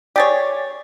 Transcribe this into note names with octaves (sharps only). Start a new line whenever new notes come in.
G4 G#4 C#5 D5 A6